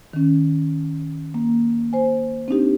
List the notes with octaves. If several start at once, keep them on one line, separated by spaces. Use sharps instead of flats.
D#3 C#4
A#3
C5 G#5
C4 D4 D#4 G4